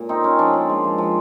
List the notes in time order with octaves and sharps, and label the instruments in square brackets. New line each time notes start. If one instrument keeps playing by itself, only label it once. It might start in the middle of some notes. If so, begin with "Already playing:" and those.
Already playing: [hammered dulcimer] A#2
C4 D#4
C4 C#4
F3 D4
A#2
G#3
F3
F3